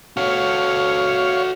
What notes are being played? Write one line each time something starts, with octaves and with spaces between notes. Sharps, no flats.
F#4 A4 C#5 F5